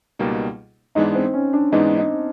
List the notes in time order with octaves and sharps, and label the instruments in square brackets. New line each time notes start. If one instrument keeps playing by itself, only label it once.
[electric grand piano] C#2 B2 G3 A#3 D#4
[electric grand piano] G#2 E3 G#3 B3 D4 [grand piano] D#4
[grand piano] C4
C#4
D4
[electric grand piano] G#2 E3 G#3 B3 D4 [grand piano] D#4
[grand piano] D#4